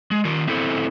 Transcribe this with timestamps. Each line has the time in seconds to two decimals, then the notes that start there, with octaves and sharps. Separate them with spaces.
0.11 G#3
0.25 D#3 F4 A#4
0.47 C4 E4 A4 C5